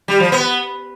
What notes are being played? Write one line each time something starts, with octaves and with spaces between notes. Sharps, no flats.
G3
F3
B3